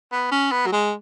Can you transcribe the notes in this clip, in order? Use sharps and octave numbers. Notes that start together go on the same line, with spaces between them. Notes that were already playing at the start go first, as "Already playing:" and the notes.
B3
C#4
B3
F#3
G#3